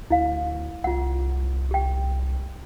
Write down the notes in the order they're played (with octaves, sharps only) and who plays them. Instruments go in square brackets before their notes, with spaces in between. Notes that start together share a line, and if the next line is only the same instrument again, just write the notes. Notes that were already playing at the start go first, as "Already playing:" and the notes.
[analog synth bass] D2 [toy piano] E4 F5
[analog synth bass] C2 [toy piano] F4 F#5
[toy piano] G4 G5